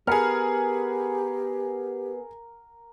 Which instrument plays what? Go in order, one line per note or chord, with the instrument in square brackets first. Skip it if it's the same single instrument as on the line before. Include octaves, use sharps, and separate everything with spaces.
[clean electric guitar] B3 [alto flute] G4 [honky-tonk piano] G#4 F6 [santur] A#4 F#5